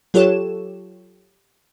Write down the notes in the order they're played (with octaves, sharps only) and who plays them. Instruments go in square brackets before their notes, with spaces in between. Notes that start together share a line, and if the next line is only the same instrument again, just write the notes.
[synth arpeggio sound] F#3 F4 G4 A4 C#5 E7